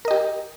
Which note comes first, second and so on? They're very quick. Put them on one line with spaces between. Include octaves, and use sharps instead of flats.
A#4 D#5 G4